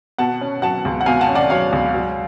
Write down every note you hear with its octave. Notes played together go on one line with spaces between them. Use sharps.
B2 F#5 A5
C#4
F#3 F#5 A5
C#2
F#5
B2 F5 G#5
F#5 A5
C#4
D5 F#5
F#3 C#5 F5
C#2
F#3